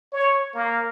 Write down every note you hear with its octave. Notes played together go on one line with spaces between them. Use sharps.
C#5
A#3